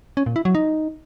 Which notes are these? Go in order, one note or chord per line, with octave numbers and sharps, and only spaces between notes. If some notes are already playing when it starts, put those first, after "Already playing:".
C#4
A#2
E4
F#3
D#4